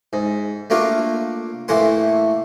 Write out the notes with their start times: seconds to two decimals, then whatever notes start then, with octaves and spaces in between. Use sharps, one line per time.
0.13 G#2
0.70 A3 A#3 D4 F4
1.68 A2 E3 A3 A#3 F#5 C6